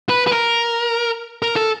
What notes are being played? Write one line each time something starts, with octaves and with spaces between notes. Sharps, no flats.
B4
B4
A#4
A#4
A4